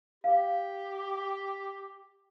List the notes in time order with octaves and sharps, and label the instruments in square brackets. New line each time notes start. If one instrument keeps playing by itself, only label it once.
[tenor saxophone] G4 [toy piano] F5